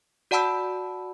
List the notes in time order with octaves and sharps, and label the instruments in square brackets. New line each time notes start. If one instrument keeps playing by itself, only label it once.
[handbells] F#4 D5 F#5 A5 B5 E6